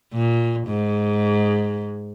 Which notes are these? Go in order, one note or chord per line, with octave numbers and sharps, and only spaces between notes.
A#2
G#2